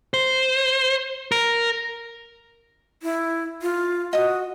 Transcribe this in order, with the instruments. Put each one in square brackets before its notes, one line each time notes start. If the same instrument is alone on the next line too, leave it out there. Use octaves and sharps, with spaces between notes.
[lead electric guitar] C5
A#4
[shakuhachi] E4
F4
[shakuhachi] F#4 [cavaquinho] D#5 D#6